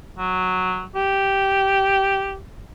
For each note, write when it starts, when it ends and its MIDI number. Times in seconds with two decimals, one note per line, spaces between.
0.19 0.84 54
0.96 2.39 67